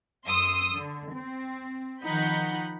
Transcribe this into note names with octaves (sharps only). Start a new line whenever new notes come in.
F#2 C6 D#6 E6
D3
C4
D#3 F3 D#4 F#5 B5 G6